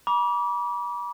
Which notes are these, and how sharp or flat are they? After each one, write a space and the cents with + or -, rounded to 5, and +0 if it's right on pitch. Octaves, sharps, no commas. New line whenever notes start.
B5 -40 D6 -20